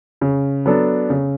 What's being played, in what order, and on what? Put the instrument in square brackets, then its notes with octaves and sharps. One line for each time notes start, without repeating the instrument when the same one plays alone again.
[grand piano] C#3
F#3 B3 D4 A4
C#3